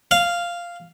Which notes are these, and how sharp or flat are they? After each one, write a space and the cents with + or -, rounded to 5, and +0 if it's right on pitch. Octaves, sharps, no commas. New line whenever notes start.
F5 -5